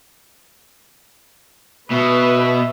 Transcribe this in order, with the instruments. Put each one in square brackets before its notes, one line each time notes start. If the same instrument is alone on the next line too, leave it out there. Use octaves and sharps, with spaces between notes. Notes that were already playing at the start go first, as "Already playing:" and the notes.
[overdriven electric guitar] B2 [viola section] B4 [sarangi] E5